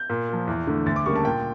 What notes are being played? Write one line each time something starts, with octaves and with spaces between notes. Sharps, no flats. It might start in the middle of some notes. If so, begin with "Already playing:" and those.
Already playing: G6
A#2
F3 A#3
E2
D3 A3
D2 A6
D6
C#3 G3 A#3 C#6
A5
A#2 G5